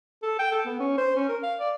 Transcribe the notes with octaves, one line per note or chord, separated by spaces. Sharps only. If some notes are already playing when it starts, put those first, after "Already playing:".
A4
G5
A4
B3
C#4
C5
C#4
A#4
F5
D5